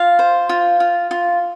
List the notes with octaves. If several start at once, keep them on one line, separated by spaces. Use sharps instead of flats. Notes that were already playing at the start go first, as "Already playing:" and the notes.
Already playing: F4 F5
C5
F4
F4
F4